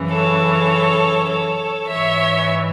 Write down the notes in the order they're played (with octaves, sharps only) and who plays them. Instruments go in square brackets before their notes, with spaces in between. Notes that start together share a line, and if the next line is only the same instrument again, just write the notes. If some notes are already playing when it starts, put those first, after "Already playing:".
Already playing: [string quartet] F#2 C#3 E3
A4 C#5
A4 C#5
G#2 E3 C#5 E5